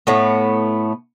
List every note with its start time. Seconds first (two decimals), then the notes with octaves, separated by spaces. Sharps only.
0.07 A2 A3 B3